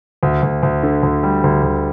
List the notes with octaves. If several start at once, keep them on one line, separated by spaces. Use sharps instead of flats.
D2
D2
D2
D3
D2
G3
D2
D2